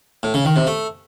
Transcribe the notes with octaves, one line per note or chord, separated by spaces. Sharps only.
A2
C#3
D#3
C3
A3